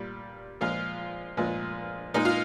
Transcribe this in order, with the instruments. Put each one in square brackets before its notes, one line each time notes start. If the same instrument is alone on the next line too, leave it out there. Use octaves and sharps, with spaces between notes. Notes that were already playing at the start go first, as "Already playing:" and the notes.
Already playing: [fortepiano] A#2 G3
A#2 F3 G#3 F4
A#2 F3 G#3
A#2 G#3 D#4
F4